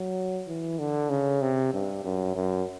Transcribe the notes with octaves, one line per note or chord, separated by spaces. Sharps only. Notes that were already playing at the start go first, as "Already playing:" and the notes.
Already playing: F#3
E3
D3
C#3
C3
G2
F#2
F#2